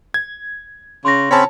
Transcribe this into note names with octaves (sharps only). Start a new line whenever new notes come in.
G#6
C#3 C6 A#6
C#3 C4 C#4 C#5 A5 B5